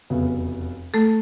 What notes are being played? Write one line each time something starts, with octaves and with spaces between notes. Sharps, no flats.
F1 E2 C#3 F#3 B3
A3 A4